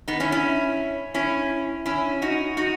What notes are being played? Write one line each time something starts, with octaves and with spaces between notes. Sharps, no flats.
B3 D#4
C#4 E4
C#4 E4
C#4 E4
C#4 E4
D#4 F#4
D#4 F#4